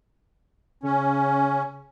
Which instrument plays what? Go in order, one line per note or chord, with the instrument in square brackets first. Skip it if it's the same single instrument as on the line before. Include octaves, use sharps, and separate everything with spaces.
[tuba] C#3 [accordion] C#4